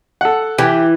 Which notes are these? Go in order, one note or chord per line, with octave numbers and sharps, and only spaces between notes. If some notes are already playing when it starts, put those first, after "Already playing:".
A4 F#5
E3 G4